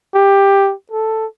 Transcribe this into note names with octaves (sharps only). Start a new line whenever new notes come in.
G4
A4